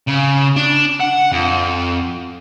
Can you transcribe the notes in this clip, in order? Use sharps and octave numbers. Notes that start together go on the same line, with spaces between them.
C#3
D4
F#5
F2